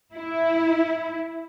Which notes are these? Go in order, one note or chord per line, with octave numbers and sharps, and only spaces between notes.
E4